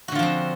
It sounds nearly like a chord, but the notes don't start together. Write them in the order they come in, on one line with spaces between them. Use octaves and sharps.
F#4 D3 F4 F3 C4